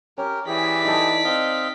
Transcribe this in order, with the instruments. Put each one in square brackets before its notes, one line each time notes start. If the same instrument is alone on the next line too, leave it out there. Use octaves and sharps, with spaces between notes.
[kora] C#4 [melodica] G4 A#4
[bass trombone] E3 [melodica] G4 G#4 [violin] D5 B6
[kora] D#4 A4
[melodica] C4 D#5 F5